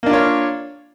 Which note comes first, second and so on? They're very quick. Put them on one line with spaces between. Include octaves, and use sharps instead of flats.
A#3 D4 F4 C#5